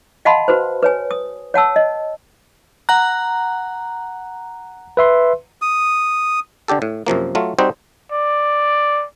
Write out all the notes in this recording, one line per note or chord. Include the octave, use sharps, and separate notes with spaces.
D#5 F5 F#5 A5 B5 C6
F#4 B4 C5
B4 C#5 G#5
D#6
C#5 F#5 A5 E6
D#5
F#5 A#5 F#6
B4 E5 C6
D#6
D3 D4 G4 A4
A2
F#2 C3 F3 A#3
F#3 A3 F4
G3 C4 D#4 F#4 C5
D5